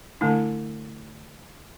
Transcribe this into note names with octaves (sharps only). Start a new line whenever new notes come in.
D3 A3 D4 E4